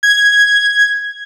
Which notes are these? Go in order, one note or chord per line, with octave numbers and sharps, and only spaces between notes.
G#6